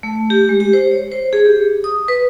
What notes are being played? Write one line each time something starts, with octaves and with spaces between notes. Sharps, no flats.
A3
G4
G#3
G4
C5
C#5
C5
G#4
G4
D#6
B4